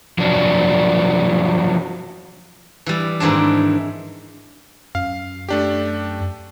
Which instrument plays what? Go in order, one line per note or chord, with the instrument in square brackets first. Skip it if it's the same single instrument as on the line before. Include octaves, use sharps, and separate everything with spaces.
[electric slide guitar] F3 F#3 D4
[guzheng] E3 G3
G#2 D#3 E3 C4 D4
[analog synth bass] F#2 [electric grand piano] F5
[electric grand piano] A3 D4 G4